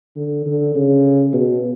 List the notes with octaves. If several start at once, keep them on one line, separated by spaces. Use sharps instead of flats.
D3
D3
C#3
B2